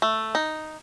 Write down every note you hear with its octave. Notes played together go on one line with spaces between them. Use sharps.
A3
D#4